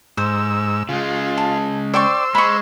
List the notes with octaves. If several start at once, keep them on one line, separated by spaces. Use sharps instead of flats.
G#2 C5 E6
C#3 G#3 F4
A5
C5 D5 G5 C#6 E6
G#3 B5 C#6